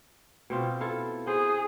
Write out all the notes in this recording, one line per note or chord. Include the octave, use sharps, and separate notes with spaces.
B2 C4 F4
E4 F4 A4
G#4 C5